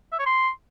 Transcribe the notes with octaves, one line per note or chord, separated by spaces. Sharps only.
E5
C#5
C6